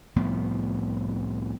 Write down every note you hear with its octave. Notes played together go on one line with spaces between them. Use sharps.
C2 A2 F3 B3